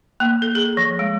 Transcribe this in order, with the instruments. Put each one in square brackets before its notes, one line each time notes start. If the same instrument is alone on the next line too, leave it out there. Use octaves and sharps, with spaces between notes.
[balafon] A#3
A4
G#4
F3
G#3